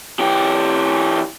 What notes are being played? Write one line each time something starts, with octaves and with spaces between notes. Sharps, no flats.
E3 G4